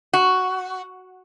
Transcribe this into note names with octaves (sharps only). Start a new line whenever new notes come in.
F#4